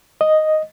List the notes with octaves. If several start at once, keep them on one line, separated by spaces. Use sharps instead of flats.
D#5